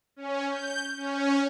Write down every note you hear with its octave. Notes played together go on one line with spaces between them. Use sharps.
C#4
G6
C#4